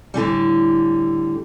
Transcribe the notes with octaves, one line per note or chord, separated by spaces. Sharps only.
A2 D3 E3 G3